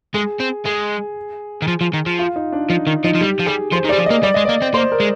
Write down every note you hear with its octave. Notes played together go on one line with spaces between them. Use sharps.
G#3 G#4
C4
G#3 G#4
D#3
F3
F3
D#3
F3
F4
D#4
D4
F3 D#4
D#3
F3 D#4
F3
G3 G4
F3
G3 G#4
F3 C5
D#3
G3 D5
F3
A#3 D#5
G3 D5
G#3 D#5
A#3 D5
C4
A#3 C5
A#4
G#3